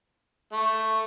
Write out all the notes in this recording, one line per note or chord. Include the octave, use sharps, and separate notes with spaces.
A3